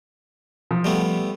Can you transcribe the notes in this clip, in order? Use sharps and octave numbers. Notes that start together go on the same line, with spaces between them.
F3
G3 A3 B3